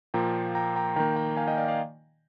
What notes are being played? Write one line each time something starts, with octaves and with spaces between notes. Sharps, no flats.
A#2 F3 A#3 G5 A#5
G5 A#5
G5 A#5
D#3 A#3 G5 A#5
G5 A#5
F5 G#5
D#5 G5
D5 F5
D5 F5